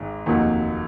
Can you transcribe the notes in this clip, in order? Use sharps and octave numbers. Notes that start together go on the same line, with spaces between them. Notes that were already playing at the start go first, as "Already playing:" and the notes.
Already playing: G#1 G#2 G#3
F1 D#2 D#3 F#3